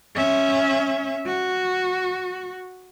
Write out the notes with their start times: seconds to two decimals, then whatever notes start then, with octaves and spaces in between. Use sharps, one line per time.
0.15 C#4 E5
1.27 F#4